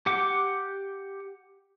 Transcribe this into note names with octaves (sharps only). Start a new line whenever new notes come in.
G4 F#5 D6